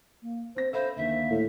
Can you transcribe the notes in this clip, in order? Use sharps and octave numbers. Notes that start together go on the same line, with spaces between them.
A#3
C4 C5 A#6
A4 C5 E5 F5 B5
D2 D#3 A#3 E5
A2